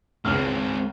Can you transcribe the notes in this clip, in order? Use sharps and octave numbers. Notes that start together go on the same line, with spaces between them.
C#2 G#3 C4 F6